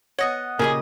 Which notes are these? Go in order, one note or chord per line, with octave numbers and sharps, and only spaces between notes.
B3 C#5 D#5 F#5 A#6
A#2 C#3 G4 G#4 A#4 D#5